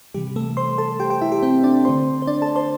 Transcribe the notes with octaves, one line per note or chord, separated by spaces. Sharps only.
C3 E3 G3 G4
A3 A4
C5 C6
A4 A5
G4 G5
G4 G5
E4 E5
G4
C4 C5
D4 D5
D3 A3 C4 C5 C6
C5
D4 D5
A4 A5
C5 C6